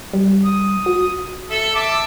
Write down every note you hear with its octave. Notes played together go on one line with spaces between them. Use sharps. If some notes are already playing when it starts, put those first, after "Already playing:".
G3
D#6
F#4
A4 E5
E5 A5 D6